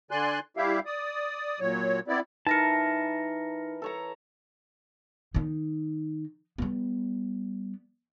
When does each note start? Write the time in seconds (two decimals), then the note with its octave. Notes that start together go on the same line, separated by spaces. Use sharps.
0.11 D3 D5 G#5 C6 F#6
0.57 G3 E4 G4 E5 F5
0.86 D5 D#6
1.60 A#2 F#3 C#5
2.08 B3 C4 E4 D5
2.47 E3 D#4 A#4 A5 A#6 C#7
3.82 A4 C#5 A#5
5.34 D#3 D#4
6.58 G3 B3